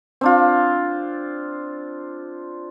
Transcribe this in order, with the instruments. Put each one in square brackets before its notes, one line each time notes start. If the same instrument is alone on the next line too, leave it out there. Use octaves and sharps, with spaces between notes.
[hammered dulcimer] C4 D4 F4